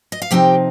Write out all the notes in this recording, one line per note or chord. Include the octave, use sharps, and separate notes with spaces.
D#5
F5
C3 F3 C4 D#4 G4 G5